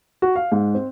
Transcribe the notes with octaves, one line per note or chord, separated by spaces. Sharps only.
F#4
F5
G#2
C4